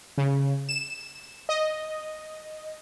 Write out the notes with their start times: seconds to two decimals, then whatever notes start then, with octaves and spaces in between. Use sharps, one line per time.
0.18 C#3
0.69 E7
1.49 D#5